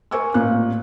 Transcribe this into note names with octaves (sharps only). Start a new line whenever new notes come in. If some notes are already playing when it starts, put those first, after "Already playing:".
A#4 C5 G#5 C#6 D6 E6
A1 A#2 F#6